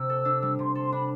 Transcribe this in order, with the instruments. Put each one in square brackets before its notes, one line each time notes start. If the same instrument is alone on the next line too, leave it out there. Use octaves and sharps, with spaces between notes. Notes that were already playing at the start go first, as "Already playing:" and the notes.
Already playing: [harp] C3 [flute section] E6
[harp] A4
D4
G3
[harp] C3 [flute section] C6
[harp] A4 [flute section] C6
[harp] D4 [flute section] B5